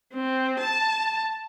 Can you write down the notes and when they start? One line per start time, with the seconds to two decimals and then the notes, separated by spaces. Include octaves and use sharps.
0.14 C4
0.60 A5